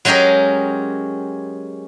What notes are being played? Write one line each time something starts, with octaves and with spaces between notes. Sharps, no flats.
F#3 G#3 C#4 G4 G#4 A#4